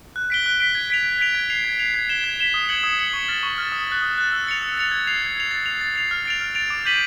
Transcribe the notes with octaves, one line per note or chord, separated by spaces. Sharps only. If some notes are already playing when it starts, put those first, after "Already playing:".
F#6
B6 D7 G7
F#6
B6 D7 G7
G#6
B6 D7 F7
G#6
B6 D7 F7
G#6
C7 F7
G#6
C7 F7
G#6
B6 E7 G7
G#6
B6 E7 G7
D#6
G#6 C#7 F#7
D#6
G#6 C#7 F#7
C#6
F6 A6
C#6
F6 A6
D#6
F#6 A6
D#6
F#6 A6
E6
A6 C#7 F7
E6
A6 C#7 F7
G#6
C7 F7
G#6
C7 F7
A6
C7 F7
A6
C7 F7
F6
A6 D7 F7
F6
A6 D7 F7
D6
G6 B6 D#7 F#7